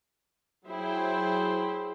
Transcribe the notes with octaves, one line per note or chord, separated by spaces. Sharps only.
F#3 E4 G#4 C5 G5